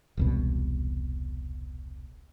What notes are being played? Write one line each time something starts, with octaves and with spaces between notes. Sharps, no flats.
E1 C2 B2